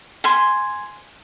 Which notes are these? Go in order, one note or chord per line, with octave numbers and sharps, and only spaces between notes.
G#5 C6